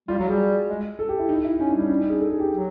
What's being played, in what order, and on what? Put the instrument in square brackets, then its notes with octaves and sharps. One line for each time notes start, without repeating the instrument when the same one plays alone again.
[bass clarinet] G3 [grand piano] F4
[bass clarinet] F#3 [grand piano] F#4
[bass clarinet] G3 [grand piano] G#4
[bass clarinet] G#3
[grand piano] A4
G4
E4
D#4
E4
[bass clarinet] C#4 [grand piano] D#4
[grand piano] D4
[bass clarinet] G3 [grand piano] C#4
[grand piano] D4
D#4
G#4
A4
G#4
G4
[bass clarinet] F#3